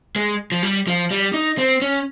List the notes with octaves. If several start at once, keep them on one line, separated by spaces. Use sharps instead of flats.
G#3
F3
G3
F3
G3
D#4
C4
C#4